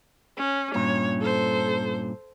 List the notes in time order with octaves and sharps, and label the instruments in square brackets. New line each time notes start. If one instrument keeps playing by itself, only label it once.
[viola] C#4
[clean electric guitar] G2 A#2 C#4 [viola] C#5
[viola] A4 C5